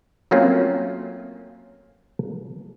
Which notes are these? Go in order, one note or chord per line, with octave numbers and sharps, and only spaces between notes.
F#3 A3 A#3 C4 C#4 F4